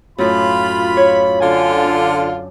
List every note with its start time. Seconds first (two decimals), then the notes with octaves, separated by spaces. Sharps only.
0.18 F#2 A2 F4 B5
0.97 C#5
1.40 D3 F4 G#5
1.85 D4